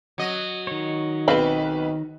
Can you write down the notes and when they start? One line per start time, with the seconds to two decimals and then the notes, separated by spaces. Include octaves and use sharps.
0.18 F#3 D#5
0.67 D#3 C#5
1.28 B1 C4 B4 F5 B5